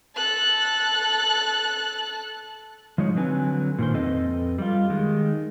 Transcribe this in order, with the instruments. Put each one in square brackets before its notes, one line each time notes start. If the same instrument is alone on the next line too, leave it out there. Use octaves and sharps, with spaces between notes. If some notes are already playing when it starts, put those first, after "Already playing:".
[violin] A4 F#6
[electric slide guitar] F3 G#3 D#4 C#5
D3 F#3 C4 B4 G#5
A#2 D#3 C5
F2 C4 A4 B4 D#5
G3 F4
D#3 G#3